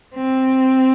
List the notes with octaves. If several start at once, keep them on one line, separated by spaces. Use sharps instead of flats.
C4